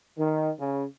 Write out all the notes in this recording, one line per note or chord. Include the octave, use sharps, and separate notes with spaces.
D#3
C#3